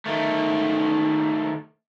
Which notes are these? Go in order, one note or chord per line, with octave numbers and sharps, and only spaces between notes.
D#3 A3